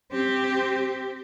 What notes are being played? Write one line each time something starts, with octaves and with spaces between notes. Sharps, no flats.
C4 G4